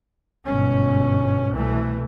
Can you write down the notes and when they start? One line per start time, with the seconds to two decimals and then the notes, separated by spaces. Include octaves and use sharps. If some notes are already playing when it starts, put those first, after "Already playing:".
0.46 G1 G#2 B2 C#4
1.52 C2 B2 E3 A3